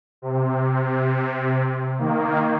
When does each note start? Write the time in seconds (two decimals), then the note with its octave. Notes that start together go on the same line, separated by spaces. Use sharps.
0.22 C3
1.99 D#3 A#3